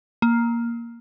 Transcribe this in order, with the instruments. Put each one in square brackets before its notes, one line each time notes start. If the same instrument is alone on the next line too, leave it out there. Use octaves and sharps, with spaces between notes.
[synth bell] A#3